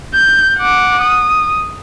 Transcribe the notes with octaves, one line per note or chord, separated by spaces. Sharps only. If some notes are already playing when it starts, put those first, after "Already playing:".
G6
F#5 D6
D#6